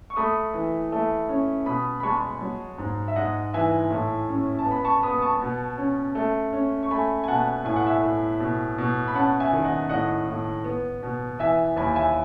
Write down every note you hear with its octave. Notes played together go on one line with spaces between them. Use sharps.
C#6
A3 B5 D#6
E3
A3
C#4
B2 B5 D#6
B5
G#3 A5 C#6
F#3
G#2
E5
G#2 D#5 F#5
E3 E5 G#5
A2
C#4
A5
B3
B5
A5 C#6
B3 B5 D#6
A5 C#6
B2
C#4
A3
C#4
C#6
A3 G#5 B5
G#5
B2 F#5 A5
A2 G#5
F#5
E5 G#5
A2
B2
B2
B5
C#4 F#5 A5
E5 G#5
D#3
D#5 F#5
A2 D#5 F#5
A2
B3
B2
E3 E5 G#5
D#2 G#5 B5
E5 G#5